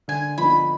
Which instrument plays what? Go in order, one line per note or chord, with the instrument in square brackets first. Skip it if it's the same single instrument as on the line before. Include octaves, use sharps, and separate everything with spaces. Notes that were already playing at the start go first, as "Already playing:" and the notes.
[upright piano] D3 [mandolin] G#5
[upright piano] F3 B3 D#4 [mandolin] B5